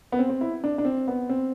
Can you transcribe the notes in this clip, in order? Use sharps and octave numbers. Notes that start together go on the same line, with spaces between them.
B3
C4
C4
E4
D4
D4
C4
B3
C4